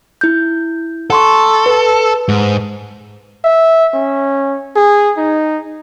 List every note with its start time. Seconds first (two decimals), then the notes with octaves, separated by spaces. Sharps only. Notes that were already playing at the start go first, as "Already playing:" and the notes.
0.21 E4 G6
1.10 A4 F#5 C6 C#6
1.66 B4
2.28 G#2
3.45 E5
3.94 C#4
4.76 G#4
5.17 D#4